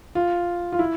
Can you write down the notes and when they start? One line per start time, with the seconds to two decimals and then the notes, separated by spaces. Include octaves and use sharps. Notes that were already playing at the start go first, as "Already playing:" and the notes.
0.15 F4
0.73 F4
0.79 E4